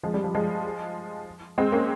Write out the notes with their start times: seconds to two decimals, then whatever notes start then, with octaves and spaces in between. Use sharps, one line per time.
0.03 F3 G#3
0.14 G3
0.24 F3
0.35 F3 G#3
1.58 G#3 C4
1.72 A#3 C#4